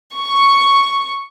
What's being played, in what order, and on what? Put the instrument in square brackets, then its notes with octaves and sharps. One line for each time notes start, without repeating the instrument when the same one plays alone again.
[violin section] C#6